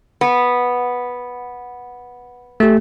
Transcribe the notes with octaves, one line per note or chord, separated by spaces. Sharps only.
B3
A3 G4